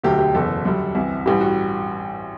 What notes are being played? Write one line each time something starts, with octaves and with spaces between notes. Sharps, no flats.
E1 D2 D3 F#3 A3 G4
G4
F#1 E2 B2 A4
F#2 D3 G3
C2 C3 E3
A1 G2 E3 G3 G4
F#4